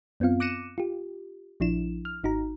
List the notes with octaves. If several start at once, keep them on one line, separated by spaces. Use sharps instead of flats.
F#2 B3 C4 F4 F5
D6 F#6 A#6 C#7 D#7 E7
F4 G4
A#1 F3 D4 E4 E7
F6
G#1 D#4 F#4 A#5